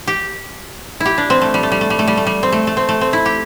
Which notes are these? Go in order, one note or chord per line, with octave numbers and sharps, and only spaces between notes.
G4
E4
G4
D4
C4
A3
G3
A3
G3
A3
G3
A3
G3
A3
G3
C4
A3
A3
C4
A3
C4
E4
G4